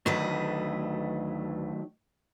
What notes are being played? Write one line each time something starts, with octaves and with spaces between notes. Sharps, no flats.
D2 D#3 F#3 A3 B4 D#5